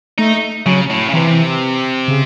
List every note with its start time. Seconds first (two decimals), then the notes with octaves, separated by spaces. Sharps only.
0.18 A3 D#4
0.66 C#3 F#3
0.90 A2
1.08 C#3
1.14 C3 E3
2.08 C#3